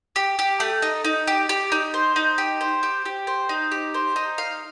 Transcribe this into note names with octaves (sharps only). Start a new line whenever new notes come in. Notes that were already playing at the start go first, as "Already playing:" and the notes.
G4
G4
A3
D#4
D#4
G4
G4
D#4
C5
D#4
G4
C5
G4
G4
C5
D#4
G4
C5
D#4
F5